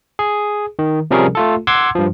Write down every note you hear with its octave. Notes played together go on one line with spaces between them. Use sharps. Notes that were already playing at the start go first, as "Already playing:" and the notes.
G#4
D#3
C3 F3 G3 C#4 G#4 A#4
A3 F4 A4
F#5 C6 D6 E6 G#6
G2 F3